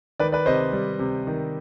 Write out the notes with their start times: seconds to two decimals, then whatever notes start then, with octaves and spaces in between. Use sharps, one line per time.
0.20 D#3 B4 D5
0.32 B4 D5
0.46 C3 C5 D#5
0.73 G3
0.99 C3
1.27 D#3